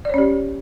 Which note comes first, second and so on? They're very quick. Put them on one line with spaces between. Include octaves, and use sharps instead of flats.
D5 C#5 C#4 G4